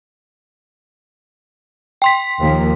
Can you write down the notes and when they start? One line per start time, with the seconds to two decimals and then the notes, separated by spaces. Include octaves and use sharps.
2.02 G5 C6 B6
2.39 D#2 F3 A#3